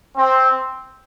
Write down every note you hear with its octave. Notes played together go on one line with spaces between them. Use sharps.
C4